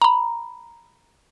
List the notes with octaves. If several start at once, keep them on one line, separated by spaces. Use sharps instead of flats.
A#5 B5